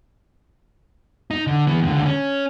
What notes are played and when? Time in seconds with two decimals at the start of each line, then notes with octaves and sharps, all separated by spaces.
1.31 D#4
1.47 D3
1.67 E3 B3
1.83 C#2 D3
2.05 C#4